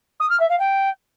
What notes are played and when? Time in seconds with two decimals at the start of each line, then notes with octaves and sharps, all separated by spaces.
0.19 D#6
0.29 F6
0.39 E5
0.49 F5
0.59 G5